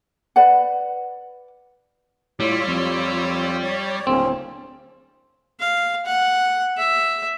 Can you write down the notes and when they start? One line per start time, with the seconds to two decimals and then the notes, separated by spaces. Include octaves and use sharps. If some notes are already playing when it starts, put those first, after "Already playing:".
0.36 B4 D5 F#5
2.40 A2 G3 F4 C#5 E6
2.68 F2
3.62 C#5 D5
4.07 D1 C#3 A#3 C4 C#4
5.60 F5
6.06 F#5
6.77 E5